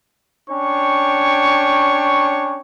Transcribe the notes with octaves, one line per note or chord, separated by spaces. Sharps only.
C#4 D4 C#5 G5 C#6